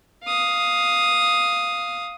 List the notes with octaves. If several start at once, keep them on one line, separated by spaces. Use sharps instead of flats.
F5 D#6